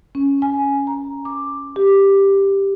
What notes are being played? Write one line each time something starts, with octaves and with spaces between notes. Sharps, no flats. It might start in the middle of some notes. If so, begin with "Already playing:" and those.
C#4
G#5
A#5
D6
G4